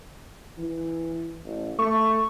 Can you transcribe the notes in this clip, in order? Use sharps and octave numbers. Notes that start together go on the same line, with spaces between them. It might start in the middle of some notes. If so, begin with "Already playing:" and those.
E3
A1
A3 C#6